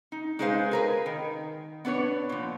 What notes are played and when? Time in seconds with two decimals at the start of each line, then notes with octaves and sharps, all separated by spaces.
0.12 D#4
0.39 G#3 D#4 G#4 B4 C5 F5
0.71 G#4 A#4 B4
1.06 D#3
1.85 B3 D4 B4 C#5
2.29 A#2 F3